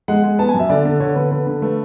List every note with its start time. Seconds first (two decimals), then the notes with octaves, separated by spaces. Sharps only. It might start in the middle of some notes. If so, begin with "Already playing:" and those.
0.08 G#3 F#5
0.24 G#3
0.39 B3 A5
0.49 G#5
0.54 F#2
0.59 E5
0.69 D3 D5
0.85 D3
1.00 D3 C#5
1.15 D3 B4
1.31 D3 B4
1.47 D3
1.62 A3 B4